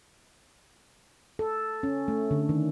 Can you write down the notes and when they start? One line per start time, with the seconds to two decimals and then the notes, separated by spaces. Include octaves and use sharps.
1.39 A4
1.83 C#4
2.08 A3
2.31 D3
2.49 D#3